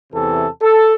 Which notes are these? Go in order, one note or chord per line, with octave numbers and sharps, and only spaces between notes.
E2 C3 E3 A4
A4